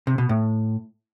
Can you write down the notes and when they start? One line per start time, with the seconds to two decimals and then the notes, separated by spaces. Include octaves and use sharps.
0.07 C3
0.18 B2
0.29 A2